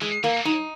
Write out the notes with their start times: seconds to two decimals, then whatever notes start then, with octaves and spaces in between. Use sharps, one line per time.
0.01 E3 G#3
0.24 E3 A#3
0.45 F#3 D#4